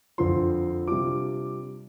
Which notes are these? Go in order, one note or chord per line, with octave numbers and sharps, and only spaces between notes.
F2 D3 F3 C4 F4 C6
C3 G3 D4 F4 D6